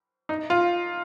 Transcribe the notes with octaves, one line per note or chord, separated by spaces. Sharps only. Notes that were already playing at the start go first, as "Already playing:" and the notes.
D#4
F4